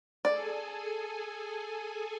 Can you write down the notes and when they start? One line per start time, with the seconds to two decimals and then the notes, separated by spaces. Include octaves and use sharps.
0.25 G#4 A4 D5 G#5